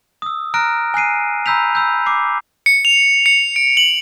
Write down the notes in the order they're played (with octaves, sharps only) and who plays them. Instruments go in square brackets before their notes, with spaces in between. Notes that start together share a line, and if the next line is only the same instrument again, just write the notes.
[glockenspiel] D#6 E6
A#5 F6 F#6 A#6 D7
G#5 F#6 C7 D#7
A#5 B5 E6 G6 B6 F7
B5 E6 G6
D6 C7
[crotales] C#7
F7
C#7
D7
F#7